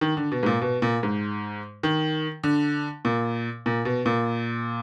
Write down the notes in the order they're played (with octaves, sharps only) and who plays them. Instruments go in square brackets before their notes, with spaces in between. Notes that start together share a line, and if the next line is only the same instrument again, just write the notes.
[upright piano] D#3
D3
B2
G#2
A#2
B2
A#2
G#2
D#3
D3
A#2
A#2
B2
A#2